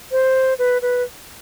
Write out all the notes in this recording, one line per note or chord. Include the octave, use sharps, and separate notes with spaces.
C5
B4
B4